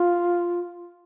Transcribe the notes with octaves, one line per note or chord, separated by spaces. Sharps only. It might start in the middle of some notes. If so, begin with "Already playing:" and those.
Already playing: F4